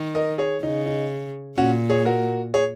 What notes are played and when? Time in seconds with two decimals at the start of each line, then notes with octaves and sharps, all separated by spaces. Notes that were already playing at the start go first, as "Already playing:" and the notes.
Already playing: D#3
0.15 A#4 D#5
0.38 G#4 C#5
0.62 C#3 D#4
0.86 D#4
1.58 A#2 C#4 F#4
1.90 G#4 C#5
2.05 F#4 A#4
2.54 G#4 C#5